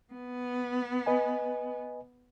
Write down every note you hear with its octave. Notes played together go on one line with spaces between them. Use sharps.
B3
B4 D#5 G#5